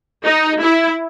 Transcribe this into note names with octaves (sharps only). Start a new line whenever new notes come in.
D#4
E4